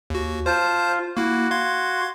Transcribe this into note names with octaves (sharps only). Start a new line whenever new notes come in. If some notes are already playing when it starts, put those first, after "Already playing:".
D#2 F#4
F4 C5 A5 G6
A#3 E4 F#4
F5 C6 G#6